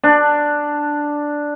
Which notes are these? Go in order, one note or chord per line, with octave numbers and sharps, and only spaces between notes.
D4